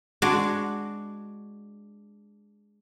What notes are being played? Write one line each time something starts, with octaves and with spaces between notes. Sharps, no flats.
G#3 D4 F#4 D5